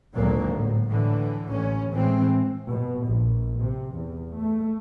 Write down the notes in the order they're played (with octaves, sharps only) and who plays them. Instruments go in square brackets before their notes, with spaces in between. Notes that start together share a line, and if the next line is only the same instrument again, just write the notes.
[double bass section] G#1 D2 A#2 D3 F#3 A#3
A2
A2 D3 E3
A1 C#4
A2 E3 G#3 C4
B2
A#1
C3
E2
A3